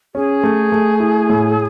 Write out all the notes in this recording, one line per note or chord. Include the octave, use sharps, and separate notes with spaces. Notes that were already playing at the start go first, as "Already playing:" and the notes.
C#4 G#4
A3
A3
E4
A2